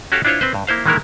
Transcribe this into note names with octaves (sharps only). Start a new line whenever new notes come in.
C#4 F#4 G4 A4 F5
D4 E4 F4 C5 C#5
C4 B4 C5
G2
A#3 E4 C5 F5
D#3 E3 G#3 A#3 E4 A#4